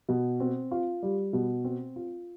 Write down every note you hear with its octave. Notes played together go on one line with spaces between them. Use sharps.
B2
C4
F4
G3
B2
C4
F4